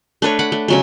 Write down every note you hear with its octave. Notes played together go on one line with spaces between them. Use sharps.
A3 D4 B4 C#5
F#5 B5 D6
A3
C#3 F#3 G#3